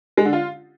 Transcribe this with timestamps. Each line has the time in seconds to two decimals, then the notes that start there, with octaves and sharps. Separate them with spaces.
0.17 G#3
0.25 D3
0.33 F4